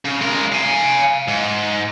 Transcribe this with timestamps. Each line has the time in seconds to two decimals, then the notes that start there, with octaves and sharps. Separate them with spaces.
0.05 C#3
0.21 G#3 A#4
0.52 F5 G#5
1.28 G#2